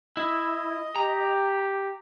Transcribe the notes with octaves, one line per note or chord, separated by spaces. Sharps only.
E4 D#5
G4 A#5